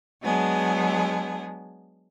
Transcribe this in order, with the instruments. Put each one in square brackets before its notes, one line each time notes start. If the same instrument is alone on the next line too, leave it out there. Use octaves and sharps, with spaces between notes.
[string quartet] F#3 G#3 B3 D4 G#4